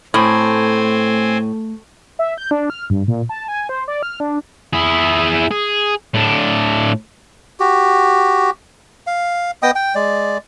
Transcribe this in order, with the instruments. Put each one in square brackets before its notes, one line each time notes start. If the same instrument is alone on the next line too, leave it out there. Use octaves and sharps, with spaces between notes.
[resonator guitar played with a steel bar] A2 [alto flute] A3 [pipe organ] C4 C5 G#5
[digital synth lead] E5
G6
D4
F6
G2
A#2
A5
G#5
C5
D5
F6
D4
[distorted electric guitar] E4 G#4
G#4
A2 D4
[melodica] F#4 G4
F5
B3 D#5 G5 D#6
G5
G#3 D5